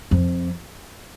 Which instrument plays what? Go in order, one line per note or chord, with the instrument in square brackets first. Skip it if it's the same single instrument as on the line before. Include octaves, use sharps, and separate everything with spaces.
[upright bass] F2